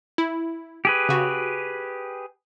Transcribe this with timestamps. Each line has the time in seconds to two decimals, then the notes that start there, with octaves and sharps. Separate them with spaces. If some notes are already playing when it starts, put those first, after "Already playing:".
0.18 E4
0.85 G4 G#4 B4
1.09 C#3 F#4